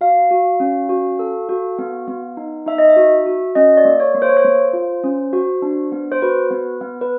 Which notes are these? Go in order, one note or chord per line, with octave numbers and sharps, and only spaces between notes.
F#4 F5
F#4
C#4
F#4
A4
F#4
B3
B3
D#4
D#4 E5
D#5
E5
F#4
F#4
C#4 D#5
D5
A#3
C#5
A#3
C5
C#5
C5
A#3
F4
C#4
F#4
D4
B3
C5
F#4 B4
B3
B3
B4